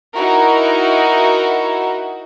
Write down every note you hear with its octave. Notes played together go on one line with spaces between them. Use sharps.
D#4 E4 F#4 A#4